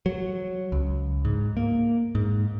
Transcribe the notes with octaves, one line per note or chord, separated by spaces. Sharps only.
F#3
C#2
G#2
A#3
G#2